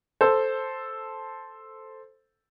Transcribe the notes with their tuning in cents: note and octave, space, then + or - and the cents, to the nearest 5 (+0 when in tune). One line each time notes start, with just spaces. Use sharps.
A4 +0 C5 +0